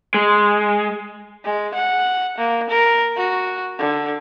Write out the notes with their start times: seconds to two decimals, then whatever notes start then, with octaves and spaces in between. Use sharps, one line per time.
0.14 G#3
1.45 G#3
1.74 F#5
2.38 A#3
2.70 A#4
3.16 F#4
3.79 D3